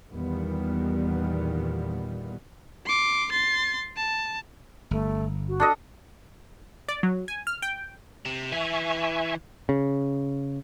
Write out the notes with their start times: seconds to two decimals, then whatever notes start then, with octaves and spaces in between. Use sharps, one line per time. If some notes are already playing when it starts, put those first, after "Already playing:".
0.10 E2 A#2 D#3 G3 B3
2.86 C6 D6
3.31 C6 A6
3.97 A5
4.91 G1 A3
5.48 F#4
5.60 D4 A4 D#5
6.89 D5
7.03 F#3
7.28 G#5
7.47 F6
7.62 G5
8.25 C3
8.52 E3 E5 G#5 C#6
9.69 C#3